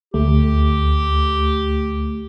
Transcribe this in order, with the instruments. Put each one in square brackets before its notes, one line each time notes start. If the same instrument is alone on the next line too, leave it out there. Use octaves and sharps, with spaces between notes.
[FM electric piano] D2 A3 [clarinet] G4